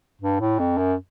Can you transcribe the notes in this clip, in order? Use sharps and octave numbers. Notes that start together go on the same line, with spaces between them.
G2
A2
F2
F#2